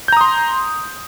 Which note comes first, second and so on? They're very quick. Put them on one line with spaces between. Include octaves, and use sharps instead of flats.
G6 A#5 D#6 C6